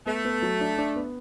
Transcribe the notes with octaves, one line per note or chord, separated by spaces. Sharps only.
A3 B3
B3
F#3
D4
D4
B3